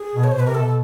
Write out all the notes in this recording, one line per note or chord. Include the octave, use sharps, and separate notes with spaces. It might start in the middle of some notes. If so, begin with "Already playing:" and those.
Already playing: G#4
B2
C#5
C5
B2 B4
C3 A#4
A4
B2